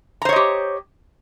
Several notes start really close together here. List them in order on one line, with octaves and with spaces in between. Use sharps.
A#5 C5 C#5 D#5 G4